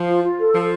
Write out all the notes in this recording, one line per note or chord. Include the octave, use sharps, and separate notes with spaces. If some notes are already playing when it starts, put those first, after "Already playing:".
Already playing: F3
F4
F4
A4
F3 F4